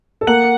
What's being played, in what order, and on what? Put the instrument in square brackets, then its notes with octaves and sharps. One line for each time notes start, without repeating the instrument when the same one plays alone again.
[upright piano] A4
[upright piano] A#3 A#4 [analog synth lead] F#5